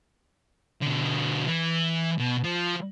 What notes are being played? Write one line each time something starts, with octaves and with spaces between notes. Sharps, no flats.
B2 D3
E3
B2
F3